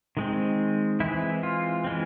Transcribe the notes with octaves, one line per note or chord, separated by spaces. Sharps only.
D#3 G#3 C4
E3 G#3 C4 E4
F4
E3 G#3 C4